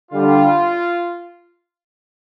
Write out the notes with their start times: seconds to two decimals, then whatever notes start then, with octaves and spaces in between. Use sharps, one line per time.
0.11 D3 G3 F4